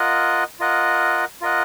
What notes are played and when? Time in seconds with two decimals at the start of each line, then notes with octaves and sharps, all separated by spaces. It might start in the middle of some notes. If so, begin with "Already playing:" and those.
Already playing: F4 A#4 D#5 F#5
0.60 F4 A#4 D#5 F#5
1.41 F4 A#4 D#5 F#5